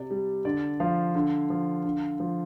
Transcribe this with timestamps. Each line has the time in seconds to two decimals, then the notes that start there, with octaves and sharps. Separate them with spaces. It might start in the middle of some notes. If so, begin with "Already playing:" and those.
Already playing: C3 D5
0.11 G3
0.45 D3 D5
0.80 F3 F5
1.15 D3
1.50 F3
1.84 D3
2.20 F3